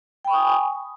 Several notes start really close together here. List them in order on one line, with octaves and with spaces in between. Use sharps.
G5 B5 C#6 D#6 G#5